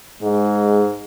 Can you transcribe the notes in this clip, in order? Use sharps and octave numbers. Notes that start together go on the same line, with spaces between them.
G#2 G#3